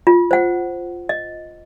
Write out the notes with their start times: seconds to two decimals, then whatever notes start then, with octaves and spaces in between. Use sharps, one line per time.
0.07 F4
0.31 C5 F#5
1.09 D#5